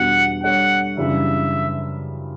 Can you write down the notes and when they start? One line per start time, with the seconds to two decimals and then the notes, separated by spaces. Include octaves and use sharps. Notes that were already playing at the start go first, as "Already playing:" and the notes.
Already playing: E2 B2 G3 D4 F#4 F#5
0.44 G3 D4 A4 C#5 F#5
0.97 F#2 C#3 E3 G3 D4 E5